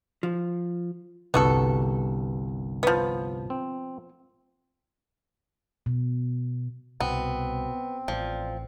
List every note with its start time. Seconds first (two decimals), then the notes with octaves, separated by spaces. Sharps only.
0.23 F3
1.34 G1 C2 G2 B3 F#4 A4
2.83 F3 B3
3.50 C4
5.86 B2
7.00 C2 B2 B3 C4
8.08 A1 F3 F4 D5